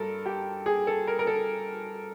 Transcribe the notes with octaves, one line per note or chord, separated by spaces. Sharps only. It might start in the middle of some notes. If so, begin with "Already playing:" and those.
Already playing: G2 A4 A#4
G4
G#4
A4
A#4
A#4
A4